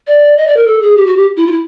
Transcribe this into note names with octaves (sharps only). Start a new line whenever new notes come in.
D5
D#5
D5
A#4
A4
G#4
G4
F#4
G4
E4
F4
E4